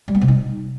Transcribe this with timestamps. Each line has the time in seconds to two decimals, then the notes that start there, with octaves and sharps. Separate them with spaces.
0.08 G3
0.15 B3
0.21 C3
0.28 D#4